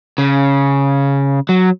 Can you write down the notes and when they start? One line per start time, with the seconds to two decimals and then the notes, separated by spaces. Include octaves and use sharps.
0.18 C#3
1.49 F#3